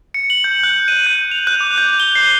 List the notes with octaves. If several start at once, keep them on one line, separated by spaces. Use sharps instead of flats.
C#7
F#7
G6
F#6
D#7
G6
F7
F#6
D6
G6
G7
C7